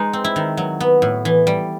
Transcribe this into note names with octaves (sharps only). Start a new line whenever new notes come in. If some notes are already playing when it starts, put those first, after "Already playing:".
Already playing: G#3 D#4
C4
E4
D#3
F#3
B3
A2
E3
G3